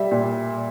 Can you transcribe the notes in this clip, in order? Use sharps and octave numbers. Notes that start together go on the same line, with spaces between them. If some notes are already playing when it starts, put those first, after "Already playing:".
Already playing: G3 E5
A#2